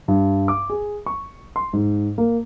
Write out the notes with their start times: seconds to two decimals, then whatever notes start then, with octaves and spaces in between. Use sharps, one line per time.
0.08 G2
0.48 D6
0.70 G#4
1.06 C#6
1.56 C6
1.73 G#2
2.18 A#3